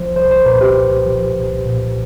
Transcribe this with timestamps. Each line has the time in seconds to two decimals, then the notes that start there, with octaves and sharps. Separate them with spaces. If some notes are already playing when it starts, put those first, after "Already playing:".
Already playing: C2 F3 C5
0.15 C2 C5
0.31 C5
0.45 A#2 B4
0.61 G4
0.76 C2
1.06 F3
1.36 C2
1.66 A#2